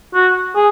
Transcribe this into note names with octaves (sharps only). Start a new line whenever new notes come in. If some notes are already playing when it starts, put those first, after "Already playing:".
F#4
G#4